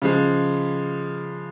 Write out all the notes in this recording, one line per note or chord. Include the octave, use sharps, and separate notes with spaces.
C#3 F3 G#3